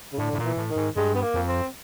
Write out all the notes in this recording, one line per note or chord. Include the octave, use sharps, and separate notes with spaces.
C#3
A2 D3
A2
A#2
E3
A2
D#3
G#2
G2 G#3
B3
A#3
F2
C4